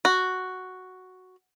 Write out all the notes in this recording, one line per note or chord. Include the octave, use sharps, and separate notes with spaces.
F#4